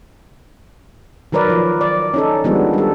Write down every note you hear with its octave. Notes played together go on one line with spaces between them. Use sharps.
D#3 F#3 A#4 B4 D5
F3
D5
C#4 D#4 A4
D#3 F3 G3 G#3 B3 D4
G3 A4